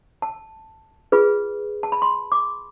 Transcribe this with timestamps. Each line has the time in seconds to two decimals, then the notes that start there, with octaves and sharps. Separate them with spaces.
0.22 A5
1.12 F4 G#4 B4
1.83 A5
1.92 B5
2.02 C6
2.32 D6